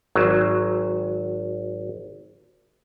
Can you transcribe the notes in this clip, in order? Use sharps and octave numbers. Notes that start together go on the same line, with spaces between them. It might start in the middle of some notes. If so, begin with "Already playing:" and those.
G#1 F#3